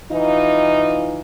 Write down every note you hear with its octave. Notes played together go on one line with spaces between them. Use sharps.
E3 D#4 F4